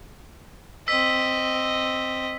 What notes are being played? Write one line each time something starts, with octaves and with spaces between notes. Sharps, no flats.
C4 D#5 E6 B6